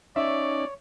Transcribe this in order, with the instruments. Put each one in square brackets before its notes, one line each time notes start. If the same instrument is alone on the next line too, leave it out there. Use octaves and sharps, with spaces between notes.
[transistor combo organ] C#4 D#4 [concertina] C#5 [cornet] D5 [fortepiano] E5